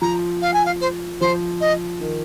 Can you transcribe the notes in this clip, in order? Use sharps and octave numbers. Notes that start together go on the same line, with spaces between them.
F3 A#5
F5
G#5
F5
C5
F3 C5
D#5
D#3